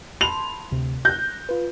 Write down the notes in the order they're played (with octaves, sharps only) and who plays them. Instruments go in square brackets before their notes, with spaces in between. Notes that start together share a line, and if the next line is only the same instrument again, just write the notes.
[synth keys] A5 B5 C6 [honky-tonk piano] F7
[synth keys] D2 C3
[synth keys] F#6 A#6 [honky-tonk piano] G6
[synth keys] F4 B4